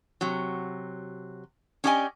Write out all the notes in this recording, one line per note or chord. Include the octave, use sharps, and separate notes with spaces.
C3 F#3
C#4 D4 G4 D5 D#5 G#5